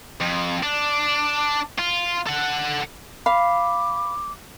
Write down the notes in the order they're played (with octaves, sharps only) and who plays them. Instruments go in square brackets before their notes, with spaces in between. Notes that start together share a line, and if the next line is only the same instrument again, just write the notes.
[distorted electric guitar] F2
D4
F4
A4 F#5
[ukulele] F5 [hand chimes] B5 [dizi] D6